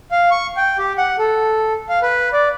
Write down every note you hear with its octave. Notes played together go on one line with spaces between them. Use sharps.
F5
C#6
G5
G4
F#5
A4
F5
B4
D5